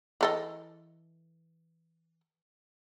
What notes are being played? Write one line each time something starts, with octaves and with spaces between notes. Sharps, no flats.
E3 A4 D#5